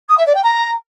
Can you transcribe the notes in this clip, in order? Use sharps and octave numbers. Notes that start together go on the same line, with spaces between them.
D#6
E5
D5
G5
A#5